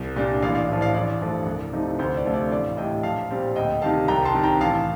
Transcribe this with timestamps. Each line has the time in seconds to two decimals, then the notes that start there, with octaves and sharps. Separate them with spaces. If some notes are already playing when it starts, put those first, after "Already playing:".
Already playing: C2
0.16 A#2 G3 D4
0.42 A1 D5 F5
0.55 D5 F5
0.69 A2 F3
0.81 D5 F5
0.95 A1 D5
1.21 G2 F3 A3
1.46 C2
1.73 C3 F3 A3 D#4
1.99 D2 C5
2.17 D5
2.25 C3 F3 A3 D4
2.34 D5
2.51 A1 D5 F5
2.77 A2 G3 D#5 G5
3.03 A#1 F5 A5
3.31 A#2 G3 C4
3.56 D2 D#5 G5
3.82 C3 D#3 G3 F5 A5
4.08 C2 G5 A#5
4.25 A5 C6
4.34 C3 D#3
4.43 G5 A#5
4.61 A1 F5 A5